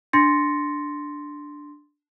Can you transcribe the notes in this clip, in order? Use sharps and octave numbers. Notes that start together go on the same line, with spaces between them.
D4 C6 A6 A#6 C#7